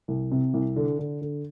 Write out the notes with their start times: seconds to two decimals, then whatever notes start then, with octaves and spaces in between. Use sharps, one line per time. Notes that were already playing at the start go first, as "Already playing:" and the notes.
0.08 C2
0.32 C3
0.54 C2
0.76 D3
0.99 D3
1.21 D3